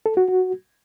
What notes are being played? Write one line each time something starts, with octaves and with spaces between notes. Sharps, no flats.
A4
F#4
F#4